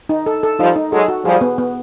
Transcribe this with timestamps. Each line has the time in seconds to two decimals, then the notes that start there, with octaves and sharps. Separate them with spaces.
0.09 D#4
0.26 A4
0.43 A4
0.59 F3 G3 D#4
0.76 D#4
0.92 F#3 G#3 A4
1.08 F#4
1.25 F3 G3 G#4
1.41 B3
1.58 B3